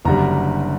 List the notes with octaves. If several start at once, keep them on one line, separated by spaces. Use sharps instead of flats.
F#1 F#2 D3 G3 A#5